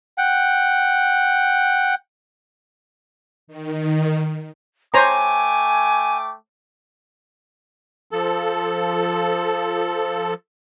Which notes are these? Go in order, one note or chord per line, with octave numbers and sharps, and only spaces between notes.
F#5 G5
D#3
A3 C5 C#5 G5 G#5 A#5 D6
F3 A4